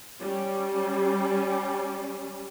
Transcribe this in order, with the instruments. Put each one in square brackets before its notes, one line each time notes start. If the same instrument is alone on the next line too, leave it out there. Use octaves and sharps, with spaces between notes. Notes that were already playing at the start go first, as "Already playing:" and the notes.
[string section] G3 C#4